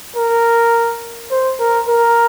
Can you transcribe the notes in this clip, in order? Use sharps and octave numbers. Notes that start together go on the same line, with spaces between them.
A#4
C5
A#4
A#4